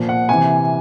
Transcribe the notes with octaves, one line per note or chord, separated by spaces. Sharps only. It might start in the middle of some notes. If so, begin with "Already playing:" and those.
Already playing: A#2 F3
F#5
C3 E3 G#5